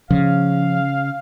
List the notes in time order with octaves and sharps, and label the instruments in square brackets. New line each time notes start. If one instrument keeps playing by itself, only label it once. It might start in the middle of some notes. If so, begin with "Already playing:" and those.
[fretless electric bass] C#3 [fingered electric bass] F3 [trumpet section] F5